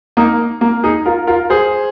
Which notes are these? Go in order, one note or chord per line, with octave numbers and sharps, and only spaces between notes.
A#3 D#4
A#3
D#4 G#4
F4 A#4
F4 A#4
G#4 C5